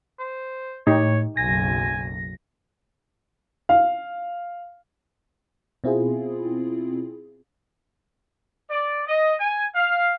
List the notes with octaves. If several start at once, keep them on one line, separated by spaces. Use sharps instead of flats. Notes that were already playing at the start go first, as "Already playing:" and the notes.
C5
A2 D#4 G4 C#5
F#1 B1 G#5 A#6
F5
B2 C4 E4 F4 G#4
D5
D#5
G#5
F5